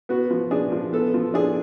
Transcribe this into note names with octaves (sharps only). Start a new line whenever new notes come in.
B3 F#4
F3
D4 G#4
F3
B3 A4
F3
D4 G#4